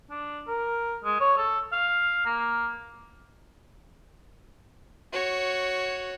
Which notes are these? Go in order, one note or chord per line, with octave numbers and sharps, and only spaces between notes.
D4
A#4
G#3
C#5
A4
F5
A#3
F#4 C#5